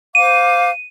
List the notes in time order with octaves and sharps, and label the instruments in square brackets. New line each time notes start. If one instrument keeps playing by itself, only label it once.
[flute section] C5 F5 D6 [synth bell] D#7